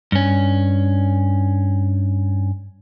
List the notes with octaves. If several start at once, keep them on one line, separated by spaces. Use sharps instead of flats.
G2 C#4